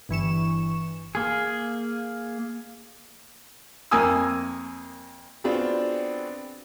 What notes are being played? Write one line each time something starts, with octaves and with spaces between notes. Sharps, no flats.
G1 E3 C#6 E7
A#3 G#4
F2 A#3 G#5 D#6 E6
B3 C4 D4 F4 F#4 G#4